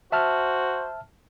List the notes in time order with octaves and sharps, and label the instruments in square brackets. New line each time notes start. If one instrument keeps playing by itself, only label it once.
[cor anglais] F#4 [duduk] C5 [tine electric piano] E5 A5 F6